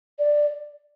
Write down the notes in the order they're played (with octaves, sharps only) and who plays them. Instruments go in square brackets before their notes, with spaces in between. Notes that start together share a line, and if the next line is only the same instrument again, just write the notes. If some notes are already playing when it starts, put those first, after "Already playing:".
[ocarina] D5